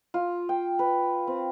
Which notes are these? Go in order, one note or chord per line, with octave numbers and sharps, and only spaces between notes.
F4
G5
B4
C4